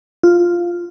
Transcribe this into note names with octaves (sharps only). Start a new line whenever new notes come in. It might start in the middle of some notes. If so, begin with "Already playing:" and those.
F4